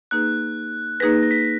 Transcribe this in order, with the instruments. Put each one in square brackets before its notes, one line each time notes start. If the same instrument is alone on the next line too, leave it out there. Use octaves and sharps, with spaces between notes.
[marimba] A#3 D#4 G#4 B4 [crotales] F#6
[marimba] A#3 D#4 G#4 B4 [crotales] A#6
[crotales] A#6
B6